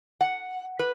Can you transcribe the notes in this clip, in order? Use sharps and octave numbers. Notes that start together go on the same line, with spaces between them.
F#5
B4